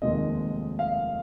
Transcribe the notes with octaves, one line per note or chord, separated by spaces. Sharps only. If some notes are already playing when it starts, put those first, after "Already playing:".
F1 D#2 D#3 G#3 C4 D#5
F5